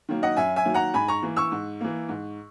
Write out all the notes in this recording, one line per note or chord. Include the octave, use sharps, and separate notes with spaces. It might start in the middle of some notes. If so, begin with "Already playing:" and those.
D#3 F#3 A#3
D#5 F#5
F#2 E5 G#5
E5 G#5
D#3 F#3 A#3
F#5 A#5
G#2 G#5 B5
A#5 C#6
E3 A#3
C#6 E6
G#2
E3 A#3
G#2